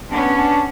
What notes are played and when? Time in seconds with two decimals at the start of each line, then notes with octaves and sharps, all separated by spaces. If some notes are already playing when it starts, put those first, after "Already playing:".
0.12 B3 C#4 D4
0.38 D4